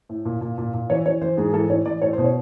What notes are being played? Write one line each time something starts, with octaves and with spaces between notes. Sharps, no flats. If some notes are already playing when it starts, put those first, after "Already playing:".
A2
A#2
A#2
A#2
A#2
E3 C#5
E3 C#5
E3 C5
G#2 G#4
G#4
E3 A4
A2 C#5
E3 D5
A2 C#5
B2 C5
C#5